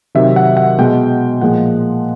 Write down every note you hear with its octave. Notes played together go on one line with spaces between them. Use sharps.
C3 D#3 F#3 E5
F#5
F#5
B2 G#3 G5
A#2 F3 G#3 F#5